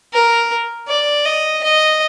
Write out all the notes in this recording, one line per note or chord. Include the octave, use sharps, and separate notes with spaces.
A#4
D5
D#5
D#5